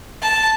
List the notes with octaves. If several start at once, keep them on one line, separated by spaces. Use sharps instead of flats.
A5